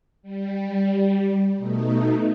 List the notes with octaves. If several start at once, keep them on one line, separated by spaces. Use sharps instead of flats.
G3
B2 A3 D#4